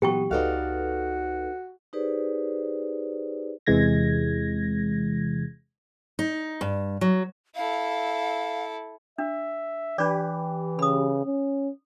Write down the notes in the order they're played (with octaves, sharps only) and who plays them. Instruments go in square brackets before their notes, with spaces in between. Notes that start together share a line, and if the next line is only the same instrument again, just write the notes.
[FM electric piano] A#2 E3 F#3 [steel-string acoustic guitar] B3 [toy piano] G4 G5 C#6
[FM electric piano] C#2 A4 B4 [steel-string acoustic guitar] D#4 D5 F5 [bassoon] F#4
[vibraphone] D#4 G4 G#4 B4 C5 D5
[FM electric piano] E2 C3 E3 G#3 G#6 A#6
[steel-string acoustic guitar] D#4
G2
F#3
[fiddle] E4 A4 [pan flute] F5
[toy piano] D4 [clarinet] E5
[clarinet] E3 [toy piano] D4 D5 [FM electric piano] G4 B4
[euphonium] C#3 [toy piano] B5 D#6
[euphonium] C#4